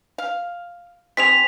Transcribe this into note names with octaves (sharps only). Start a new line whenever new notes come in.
F5
G3 C4 G#4 B6 F7